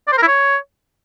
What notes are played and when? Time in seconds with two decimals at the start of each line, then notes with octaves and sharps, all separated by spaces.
0.08 D5
0.13 C5
0.18 A#4
0.23 E4
0.28 C#5